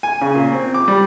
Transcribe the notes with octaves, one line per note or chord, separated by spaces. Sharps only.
G#5
C#3
A#2
C4
D6
G3